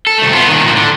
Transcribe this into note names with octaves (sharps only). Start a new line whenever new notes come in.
A4
C2 A3
B3 F4
A#2 D#3
A2 F3
D3